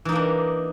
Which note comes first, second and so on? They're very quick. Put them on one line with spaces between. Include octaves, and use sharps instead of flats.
E3 D#4 A#3 D4